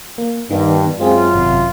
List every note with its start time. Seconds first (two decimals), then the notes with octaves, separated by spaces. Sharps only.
0.18 A#3
0.50 G2 D#3 B3 D#4
0.99 F#2 G#3 C4 F4 G#4
1.34 G#1 C3